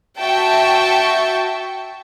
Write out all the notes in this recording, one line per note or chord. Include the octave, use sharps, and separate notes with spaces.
F#4 E5 G5 A5 C#6